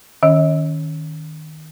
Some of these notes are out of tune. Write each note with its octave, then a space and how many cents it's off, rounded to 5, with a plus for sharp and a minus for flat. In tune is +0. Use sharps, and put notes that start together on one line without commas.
D#3 +0 C#4 +0 D#5 +40